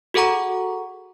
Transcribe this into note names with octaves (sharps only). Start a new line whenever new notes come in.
F#4 G#4 A4 F#5 A#5 C#6